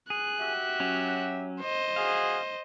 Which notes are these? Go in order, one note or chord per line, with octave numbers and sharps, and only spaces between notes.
G#4 F#6
F#4 G4 E5
F#3 C#4
C5 D#5
F#4 G#4 F5